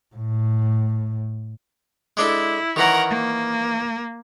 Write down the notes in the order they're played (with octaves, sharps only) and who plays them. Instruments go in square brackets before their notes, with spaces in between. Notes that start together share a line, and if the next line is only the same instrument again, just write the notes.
[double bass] A2
[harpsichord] G#3 D4 A4 [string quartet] E4
[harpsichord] D#3 E3 C#4 [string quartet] A#4 F#5 A#5
[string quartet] A#3